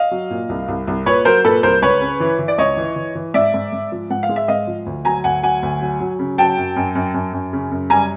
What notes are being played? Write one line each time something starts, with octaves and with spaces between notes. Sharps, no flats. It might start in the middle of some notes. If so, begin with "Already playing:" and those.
Already playing: D#5 F5
F#3
A#2
C2
C2
C2
A#2 B4 C#5
F#3 A#4 C5
A#2 A4 B4
C2 A#4 C5
C#2 B4 C#5
C#3
E3
E3
D5
C#2 C#5 D#5
E3
E3
E3
G#2 D5 E5
G#2
G#2
F3
G#2 F#5
F5
G#3
E5
G#2 D#5 F5
F3
D2
F#3 G#5 A#5
D2 F#5 G#5
F#3 F#5 G#5
D2
F#3
F#3
C#3
F#3 G5 A5
F#2
F#2
F#2
F#2
F#2
C#3
F#2
G3 G#5 A#5